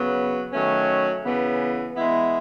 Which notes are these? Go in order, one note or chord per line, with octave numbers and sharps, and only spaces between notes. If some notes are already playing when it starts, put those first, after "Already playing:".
Already playing: C#3 F#3 B3
D#3 F#3 A3 C#4
C#3 E3 B3
E3 G#3 B3 E4